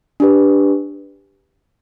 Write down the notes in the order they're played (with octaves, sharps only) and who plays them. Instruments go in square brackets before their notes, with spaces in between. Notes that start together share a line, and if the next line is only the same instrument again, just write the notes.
[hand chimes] D4 G4 B4